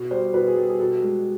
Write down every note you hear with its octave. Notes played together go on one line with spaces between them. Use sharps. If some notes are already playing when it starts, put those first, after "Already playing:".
Already playing: B2
G3 C5
B2 B4
G#4
G3 A4
G#4
B2 A4
G#3